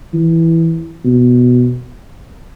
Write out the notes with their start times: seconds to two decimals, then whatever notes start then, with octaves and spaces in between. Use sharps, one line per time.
0.14 E3
1.05 B2